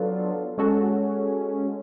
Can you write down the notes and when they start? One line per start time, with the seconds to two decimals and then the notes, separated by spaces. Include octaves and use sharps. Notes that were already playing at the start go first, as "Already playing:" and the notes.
Already playing: F#3 B3 D4 F4 A4
0.58 G#3 C#4 F#4 A4